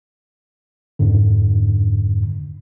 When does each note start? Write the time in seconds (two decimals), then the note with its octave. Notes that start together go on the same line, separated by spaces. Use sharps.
0.99 F2 G#2 D3